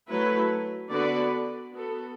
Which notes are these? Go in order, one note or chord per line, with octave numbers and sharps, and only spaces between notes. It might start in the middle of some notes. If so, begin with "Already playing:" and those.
F#3 A3 E4 B4
D3 B3 F#4 B4 D5
B3 F#4 A4